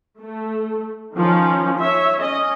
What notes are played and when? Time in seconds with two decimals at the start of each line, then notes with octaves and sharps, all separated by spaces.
0.21 A3
1.15 D#3 F3 C#4
1.79 C#5 E5
2.20 C#4 D#5